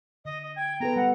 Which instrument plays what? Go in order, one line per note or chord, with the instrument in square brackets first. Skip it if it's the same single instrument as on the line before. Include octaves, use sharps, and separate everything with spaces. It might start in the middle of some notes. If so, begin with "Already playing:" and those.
[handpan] D3 [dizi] D#5
[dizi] D#5
[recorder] G5 [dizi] G#6
[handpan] B3 A4 B4 [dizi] A#5
[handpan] G3 [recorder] F#5